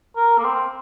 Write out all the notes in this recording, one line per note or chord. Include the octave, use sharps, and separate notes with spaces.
A#4
A#3
C4